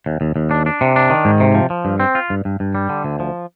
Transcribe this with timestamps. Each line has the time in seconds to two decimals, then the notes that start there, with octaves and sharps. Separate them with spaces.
0.06 D#2
0.21 D#2
0.36 D#2
0.51 D4
0.66 D4
0.81 C3
0.96 D4
1.10 D#3
1.25 G#2
1.40 C3
1.55 F3
1.70 F3
1.85 G2
2.00 C4
2.15 F4
2.30 G2
2.45 G2
2.60 G2
2.75 G3
2.89 D3
3.04 D2
3.20 F3